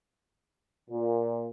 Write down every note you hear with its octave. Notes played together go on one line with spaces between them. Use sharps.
A#2